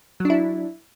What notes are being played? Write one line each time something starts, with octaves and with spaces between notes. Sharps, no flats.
F#3 D4 E4